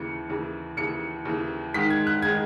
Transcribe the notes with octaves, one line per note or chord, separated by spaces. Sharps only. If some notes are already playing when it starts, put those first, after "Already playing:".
Already playing: D#2 C#3 E3 C#7
D#2 C#3 E3
D#2 C#3 E3 C#7
D#2 C#3 E3
G#2 D#3 G#3 D#4 B6
G#6
F#6
D#3 G#3 D#4 G#6